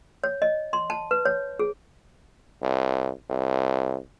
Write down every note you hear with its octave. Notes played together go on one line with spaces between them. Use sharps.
C#5
D#5
C6
A5
B4
C#5
G#4
C2
C2